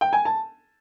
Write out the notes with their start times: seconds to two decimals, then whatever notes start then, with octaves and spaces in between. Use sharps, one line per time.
0.01 G5
0.13 G#5
0.25 A5